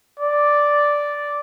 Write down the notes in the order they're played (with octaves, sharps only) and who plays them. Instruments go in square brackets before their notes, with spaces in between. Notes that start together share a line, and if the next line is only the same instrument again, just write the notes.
[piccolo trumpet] D5